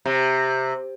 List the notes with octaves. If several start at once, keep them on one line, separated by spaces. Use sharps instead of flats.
C3